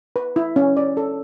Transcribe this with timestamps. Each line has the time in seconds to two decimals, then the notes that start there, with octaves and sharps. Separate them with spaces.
0.16 B4
0.36 E4
0.56 C#4
0.77 D5
0.97 A4